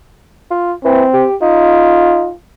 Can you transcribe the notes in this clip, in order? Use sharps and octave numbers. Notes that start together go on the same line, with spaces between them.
F4
E3 C4
G4
D#4 F4